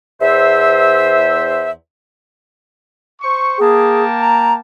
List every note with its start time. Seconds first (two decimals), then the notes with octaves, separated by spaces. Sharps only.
0.21 E2 C5 E5
3.21 C5 C#6
3.58 A#3 G#4 G5 A5
4.20 A#5